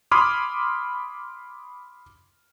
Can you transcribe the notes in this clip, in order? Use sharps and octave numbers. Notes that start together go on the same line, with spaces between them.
B5 C6 D6 D#6 F6 G#6